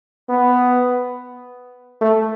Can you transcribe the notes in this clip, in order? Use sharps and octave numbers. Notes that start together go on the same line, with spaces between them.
B3
A3